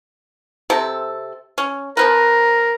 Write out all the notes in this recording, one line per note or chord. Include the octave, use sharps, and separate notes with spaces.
C3 C4 A4
C#4
F3 C4 A#4 B4